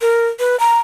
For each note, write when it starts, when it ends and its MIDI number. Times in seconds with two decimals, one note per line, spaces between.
0.01 0.26 70
0.39 0.59 71
0.60 0.79 82